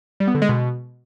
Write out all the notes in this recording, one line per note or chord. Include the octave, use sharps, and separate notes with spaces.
G3
B3
D3
G#3
B2